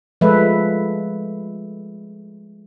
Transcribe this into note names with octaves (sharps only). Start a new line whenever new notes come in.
F3 G#3 A3 A4 B4 E5